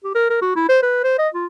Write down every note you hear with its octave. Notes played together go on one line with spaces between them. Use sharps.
G4
A#4
A#4
F#4
E4
C5
B4
C5
D#5
F4